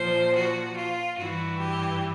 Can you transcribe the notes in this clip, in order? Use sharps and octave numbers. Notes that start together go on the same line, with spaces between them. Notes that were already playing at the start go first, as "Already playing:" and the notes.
Already playing: A#2 F3 C5
F#4
F4
G2 E3 F#4
G4